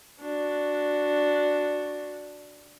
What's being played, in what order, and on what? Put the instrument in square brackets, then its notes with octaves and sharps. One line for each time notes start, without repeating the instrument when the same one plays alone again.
[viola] D4 F#4